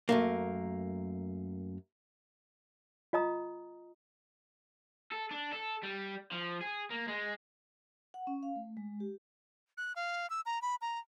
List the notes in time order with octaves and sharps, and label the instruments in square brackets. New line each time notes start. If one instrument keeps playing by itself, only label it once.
[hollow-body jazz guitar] F#2 A3 A#3
[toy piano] F4 D#5 A#5 D#6
[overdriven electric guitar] A4
D4
A4
G3
F3
G#4
A#3
G#3
[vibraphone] F#5
C#4
F5
A3
G#3
G4
[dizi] F#6
F5
E6
A#5
B5
A#5